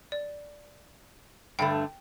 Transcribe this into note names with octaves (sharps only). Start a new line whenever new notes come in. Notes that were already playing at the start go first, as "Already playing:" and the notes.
D5
G2 D3 A3 G5